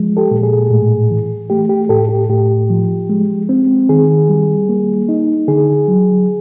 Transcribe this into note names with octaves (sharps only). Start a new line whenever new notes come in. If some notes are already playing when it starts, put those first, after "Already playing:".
Already playing: F3 G#3
G4 A4
A#2
G#4
A2
E3
A3 G4
G4
A2 G4 A4
G4
A2 G4
F3
G#3
C4
D#3 G#4
G3
A#3
D#4
D3 G#4
F#3